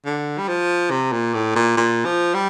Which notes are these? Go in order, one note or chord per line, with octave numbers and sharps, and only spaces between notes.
D3
G3
F3
C3
A#2
A2
A#2
A#2
F3
G3